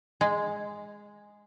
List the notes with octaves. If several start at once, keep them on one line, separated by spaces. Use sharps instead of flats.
G#3